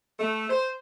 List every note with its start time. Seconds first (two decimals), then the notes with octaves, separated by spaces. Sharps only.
0.19 A3
0.49 C5